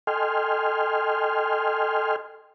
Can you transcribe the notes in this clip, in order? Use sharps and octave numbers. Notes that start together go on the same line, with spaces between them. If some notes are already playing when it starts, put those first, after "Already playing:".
A4 D#5 G5 G#5 C6 F6